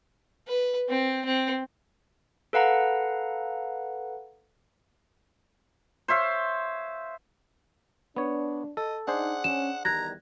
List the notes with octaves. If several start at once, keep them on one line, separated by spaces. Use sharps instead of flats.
B4
C4
C4
A4 B4 F5 F#5 A#5
C5 C#5 E5 F5
B3 D4 C#5
A4 D#5
D4 D#4 G#4 C5 F#5
C#4 E7
E2 D#3 G3 A#5 F#6 G#6 A#6